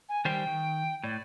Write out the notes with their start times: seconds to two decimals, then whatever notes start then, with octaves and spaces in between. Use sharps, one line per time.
0.09 G#5
0.25 D#3 G3 C5 G5
0.47 D#3
1.03 A2 D5